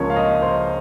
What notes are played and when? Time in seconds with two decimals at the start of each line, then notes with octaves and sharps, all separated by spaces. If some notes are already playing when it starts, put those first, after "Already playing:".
Already playing: C#2 C#3 F3 A#3 C#5
0.10 F5
0.16 D#5
0.42 C5